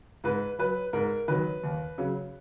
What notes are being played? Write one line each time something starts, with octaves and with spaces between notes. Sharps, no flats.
G#2 B4
F#3 B4
G#2 A#4
D#3 F#3 B4
D#2
C#3 F#3